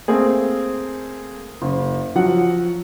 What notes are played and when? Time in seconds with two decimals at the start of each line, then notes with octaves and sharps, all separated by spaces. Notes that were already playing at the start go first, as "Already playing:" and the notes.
0.08 A3 A#3 C4 G#4
1.62 F#1
2.16 F3 F#3 F#5